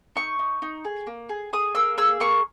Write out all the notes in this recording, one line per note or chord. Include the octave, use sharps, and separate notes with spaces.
D#4 C#6
D#4
D#4
G#4
A#3
G#4
G#4 D#6
A#3 E6
G#4 E6
A#3 C#6